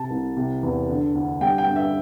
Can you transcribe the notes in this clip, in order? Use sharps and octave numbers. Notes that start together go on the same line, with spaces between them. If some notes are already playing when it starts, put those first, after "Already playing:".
Already playing: C3 A5
C2
C3
E2
D3
D2
G3 G5
G5
G2
E5